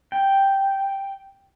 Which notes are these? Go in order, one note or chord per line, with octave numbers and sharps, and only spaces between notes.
G5